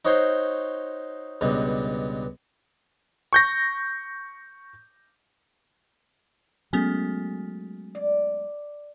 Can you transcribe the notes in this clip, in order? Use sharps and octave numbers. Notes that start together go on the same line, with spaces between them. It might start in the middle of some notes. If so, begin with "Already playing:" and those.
D#4 F#4 C5 C#5 C6
C#2 G2 B2
C#6 G6 A#6
F#3 G#3 A3 B3 C#4 G#5
D5